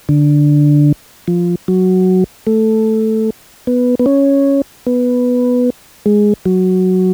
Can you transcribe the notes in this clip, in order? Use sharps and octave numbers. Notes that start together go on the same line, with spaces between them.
D3
F3
F#3
A3
B3
B3
C#4
B3
G#3
F#3